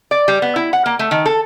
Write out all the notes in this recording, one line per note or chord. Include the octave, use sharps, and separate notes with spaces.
D5
G3
B3
E4
F#5
A#3
A3
D#3
A4